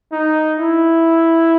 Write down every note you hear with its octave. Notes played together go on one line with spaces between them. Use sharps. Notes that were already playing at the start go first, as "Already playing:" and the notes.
D#4
E4